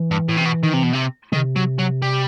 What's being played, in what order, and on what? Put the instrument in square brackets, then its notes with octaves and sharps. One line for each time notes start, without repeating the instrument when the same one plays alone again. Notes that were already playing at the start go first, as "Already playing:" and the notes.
Already playing: [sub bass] E3
[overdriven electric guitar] G2
A2
C3
B2
D#3
C3
B2
C3
[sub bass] C3 [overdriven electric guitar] D#3
[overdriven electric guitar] F#3
F#3
G3